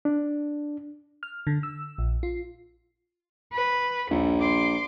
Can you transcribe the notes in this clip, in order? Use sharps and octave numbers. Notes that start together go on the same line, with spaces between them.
D4
F6
D3
E6
A#1
F4
B4
A#1 D#2
C6 D6